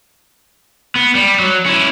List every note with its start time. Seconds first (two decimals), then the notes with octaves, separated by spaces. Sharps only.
0.96 B3
1.15 G3
1.39 F#3
1.66 C#4 E4